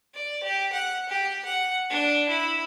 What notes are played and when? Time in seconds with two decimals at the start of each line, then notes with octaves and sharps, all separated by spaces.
0.15 D5
0.44 G4
0.73 F#5
1.09 G4
1.45 F#5
1.90 D4
2.29 E4